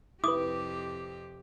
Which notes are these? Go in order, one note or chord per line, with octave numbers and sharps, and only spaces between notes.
F2 C3 E4 G4 B4 D6 D#6